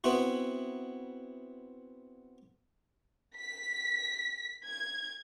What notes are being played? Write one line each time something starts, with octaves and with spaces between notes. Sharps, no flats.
B3 C4 E4 F#4
B6
G#6